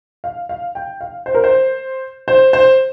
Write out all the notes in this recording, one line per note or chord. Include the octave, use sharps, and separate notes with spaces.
F5
F5
G5
F5
C5
A#4
C5
C5
C5